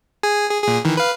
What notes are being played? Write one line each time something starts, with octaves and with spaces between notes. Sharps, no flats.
G#4 G#5
G#4
A#2 G#4
D#3 E3
B4 F5